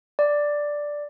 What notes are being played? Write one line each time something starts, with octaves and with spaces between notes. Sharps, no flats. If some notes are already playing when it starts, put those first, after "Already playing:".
D5